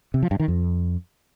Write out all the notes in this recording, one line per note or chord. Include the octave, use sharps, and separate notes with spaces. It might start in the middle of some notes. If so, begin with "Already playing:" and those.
C3
F3
G2
D#3
F2